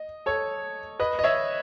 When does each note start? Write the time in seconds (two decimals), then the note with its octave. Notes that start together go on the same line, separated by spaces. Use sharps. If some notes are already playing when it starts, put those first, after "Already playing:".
Already playing: D#5
0.26 A4 C#5
1.00 B4 D#5
1.19 D#5
1.24 C#5 E5